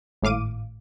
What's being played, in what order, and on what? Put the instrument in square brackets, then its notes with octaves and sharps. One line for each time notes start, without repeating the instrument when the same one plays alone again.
[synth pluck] G#1 A2 F5 D6 D#7